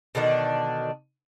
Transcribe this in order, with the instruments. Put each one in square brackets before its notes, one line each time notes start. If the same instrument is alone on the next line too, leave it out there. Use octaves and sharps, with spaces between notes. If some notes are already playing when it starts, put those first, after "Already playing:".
[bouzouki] B2 D3 D#3 D4